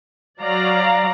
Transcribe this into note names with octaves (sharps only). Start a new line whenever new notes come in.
F#3 D5 F5 A#5